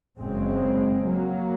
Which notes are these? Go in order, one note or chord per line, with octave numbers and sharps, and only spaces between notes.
F#1 F#2 C#3 G#3 C4
F#3 A#3